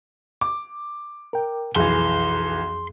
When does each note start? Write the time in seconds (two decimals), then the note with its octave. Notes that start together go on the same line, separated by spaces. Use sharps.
0.41 D6
1.33 A#4 G5
1.76 B1 F2 E3 G#4 C6